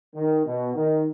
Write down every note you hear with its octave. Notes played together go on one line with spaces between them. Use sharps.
D#3
B2
D#3